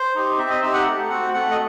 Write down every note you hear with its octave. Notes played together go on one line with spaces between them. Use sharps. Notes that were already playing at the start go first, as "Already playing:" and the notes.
Already playing: C5
D#4 G4
C4 E5
D#5
D#4 G4 E5
F#5
A3
C4 F#4 F#5
A3 F#5
D#5